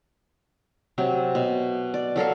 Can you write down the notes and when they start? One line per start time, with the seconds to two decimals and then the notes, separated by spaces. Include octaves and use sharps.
0.98 C3 F#3
1.35 B2
1.94 D5
2.16 F#3 A4 A#4 F5